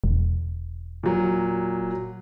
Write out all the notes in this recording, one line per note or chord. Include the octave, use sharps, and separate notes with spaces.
E1
A#2 F#3